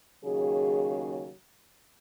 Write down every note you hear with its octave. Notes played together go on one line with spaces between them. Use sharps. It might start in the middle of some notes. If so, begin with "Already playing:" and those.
D#2 C#3 F#3 G#4